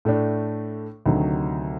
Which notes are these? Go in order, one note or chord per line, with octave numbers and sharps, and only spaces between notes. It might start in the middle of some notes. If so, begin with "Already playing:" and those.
A2 A3 D4
D2 C3 D#3 F#3